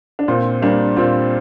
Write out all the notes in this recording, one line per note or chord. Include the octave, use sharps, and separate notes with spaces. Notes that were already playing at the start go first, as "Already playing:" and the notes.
D4
A#2 C4 F4
G3 A#3 D4 G4
A#2 C4 F4